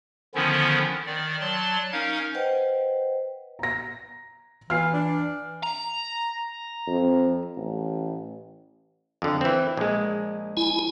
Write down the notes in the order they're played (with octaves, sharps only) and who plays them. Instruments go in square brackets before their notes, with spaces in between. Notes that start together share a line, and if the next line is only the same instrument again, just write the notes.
[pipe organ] D3 D#3 F3 B3 C#4 E4
D#3 D5
F#3 D5 A5 C6
C#4 D#4 A#4 F5 G#6
[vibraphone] B4 C5 D#5 F#5 G5
[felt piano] A#5 A#6
[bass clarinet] E3 [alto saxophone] F4 [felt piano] F6 C7
[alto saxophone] D4
[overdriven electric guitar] A#5
[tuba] F2
A1
[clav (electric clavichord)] F2 D3
E3 C4
A#1 G#3
[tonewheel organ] E4 G#5